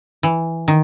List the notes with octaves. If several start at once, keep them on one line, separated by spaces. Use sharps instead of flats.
E3
D#3